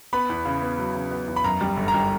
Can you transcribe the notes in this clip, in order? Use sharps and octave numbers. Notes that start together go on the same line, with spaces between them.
B3 B5
E2
C#3
B3
F#3
C#3
B3
E2
B5
F#2 A#5
G3
G1
A#5
G3